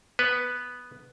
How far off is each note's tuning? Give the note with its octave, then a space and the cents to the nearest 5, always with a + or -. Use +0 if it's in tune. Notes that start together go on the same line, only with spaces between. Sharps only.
B3 +0 B4 +0